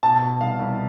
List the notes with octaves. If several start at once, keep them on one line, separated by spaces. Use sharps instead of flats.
B2 A5
B2
C2 F5
C2